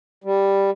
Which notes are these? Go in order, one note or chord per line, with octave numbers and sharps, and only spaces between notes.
G3